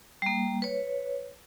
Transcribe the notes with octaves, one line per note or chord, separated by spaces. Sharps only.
G3 A#3
B4 C#5